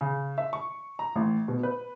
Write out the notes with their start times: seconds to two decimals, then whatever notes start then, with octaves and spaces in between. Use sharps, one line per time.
0.01 C#3
0.38 E5
0.53 C#6
0.99 A#5
1.15 A1
1.48 B2
1.63 B4